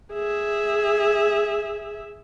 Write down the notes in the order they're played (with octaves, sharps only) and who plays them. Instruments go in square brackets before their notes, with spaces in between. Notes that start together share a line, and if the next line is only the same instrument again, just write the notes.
[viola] G#4 E5